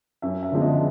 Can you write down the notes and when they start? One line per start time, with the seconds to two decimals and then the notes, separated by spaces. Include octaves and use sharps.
0.22 F#2 E5
0.43 E5
0.52 D3 F3 G#3 B3
0.62 D#5